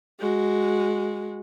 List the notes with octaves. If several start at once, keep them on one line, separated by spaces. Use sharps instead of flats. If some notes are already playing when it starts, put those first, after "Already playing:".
G#3 F#4